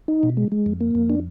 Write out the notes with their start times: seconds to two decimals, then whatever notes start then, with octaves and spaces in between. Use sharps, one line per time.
0.08 D#4
0.23 B2
0.37 G#3
0.52 G#3
0.66 F2
0.81 A#3
0.95 F2
1.10 D4